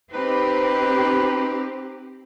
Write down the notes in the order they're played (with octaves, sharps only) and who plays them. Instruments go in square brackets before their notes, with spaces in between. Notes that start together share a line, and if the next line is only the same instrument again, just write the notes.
[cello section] C4 G4 [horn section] D#4 B4